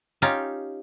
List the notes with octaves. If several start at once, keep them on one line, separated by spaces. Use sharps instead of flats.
C#4 D#4 F4 G4